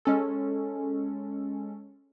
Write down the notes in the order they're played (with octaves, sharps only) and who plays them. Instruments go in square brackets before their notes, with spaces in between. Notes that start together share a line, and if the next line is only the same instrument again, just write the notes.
[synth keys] G#3 C#4 A4